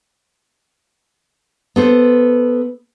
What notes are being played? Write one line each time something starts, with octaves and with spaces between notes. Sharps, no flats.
B3 A4 C5